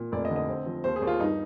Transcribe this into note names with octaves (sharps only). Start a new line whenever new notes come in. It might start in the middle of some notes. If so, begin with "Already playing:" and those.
Already playing: A#2
F1 D5
D#5
D3
D#5
C4
F3
D#2 C5
G#4
D#2
F4
G2 D#4